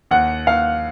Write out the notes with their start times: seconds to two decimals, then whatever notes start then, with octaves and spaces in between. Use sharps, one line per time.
0.11 D#2 F#5
0.47 D#2 F5